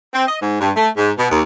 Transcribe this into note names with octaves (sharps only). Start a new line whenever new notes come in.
C4
D#5
G#2
G2
A3
G#2
B2
D#2